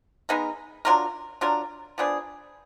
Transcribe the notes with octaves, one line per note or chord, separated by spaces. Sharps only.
G#3 B3 D#4 A#4
F#3 D4 F4 A#4
F#3 D4 F4 A#4
F3 B3 D4 G#4